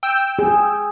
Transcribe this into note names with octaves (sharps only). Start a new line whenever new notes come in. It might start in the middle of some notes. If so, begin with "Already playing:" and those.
G5 E6
G#4